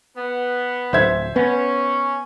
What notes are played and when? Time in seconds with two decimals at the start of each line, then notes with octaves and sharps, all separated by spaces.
0.17 B3
0.93 D1 C5 E5 G#6
1.36 B3 C#4